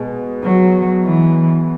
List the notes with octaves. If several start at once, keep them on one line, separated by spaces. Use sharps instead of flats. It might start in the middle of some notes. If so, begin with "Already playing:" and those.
Already playing: B2 G#3 B3
F#3
E3